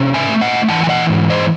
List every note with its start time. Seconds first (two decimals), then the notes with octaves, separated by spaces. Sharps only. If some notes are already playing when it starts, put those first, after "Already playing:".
Already playing: C3 C#4
0.14 E5 G#5
0.29 A3
0.41 D#5 F#5
0.69 E3 F#5 A5
0.84 G#5
0.89 D#5 F#5
1.10 G#2
1.30 C5 D#5